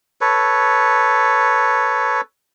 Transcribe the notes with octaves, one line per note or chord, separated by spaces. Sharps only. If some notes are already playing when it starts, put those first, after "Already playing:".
A4 B4 C#5